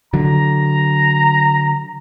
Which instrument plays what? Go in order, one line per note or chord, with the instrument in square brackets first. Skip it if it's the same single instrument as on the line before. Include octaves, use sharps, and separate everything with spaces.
[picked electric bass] D3 F#3 [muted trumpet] A#5